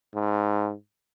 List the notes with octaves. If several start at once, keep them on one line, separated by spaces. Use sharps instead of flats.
G#2